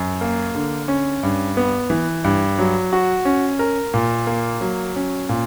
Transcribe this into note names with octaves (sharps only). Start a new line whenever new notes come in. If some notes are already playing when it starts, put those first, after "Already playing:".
Already playing: F#2
A#3
D3
C#4
G2
B3
E3
G2
F#3
F#4
C#4
A#4
A#2
A#3
F#3
C#4
A#2